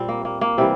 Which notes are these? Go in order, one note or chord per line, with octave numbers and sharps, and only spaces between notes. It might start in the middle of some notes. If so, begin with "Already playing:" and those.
Already playing: A#2 G3 C4
A#3
A#3
A#3
C3 E3 G3 C4